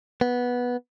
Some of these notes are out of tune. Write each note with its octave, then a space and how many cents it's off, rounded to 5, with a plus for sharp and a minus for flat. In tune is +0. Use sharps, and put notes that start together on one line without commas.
B3 -10